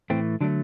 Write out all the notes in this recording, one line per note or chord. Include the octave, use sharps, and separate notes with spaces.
A2 E3 A3 C4
D3 F#3 A3 D4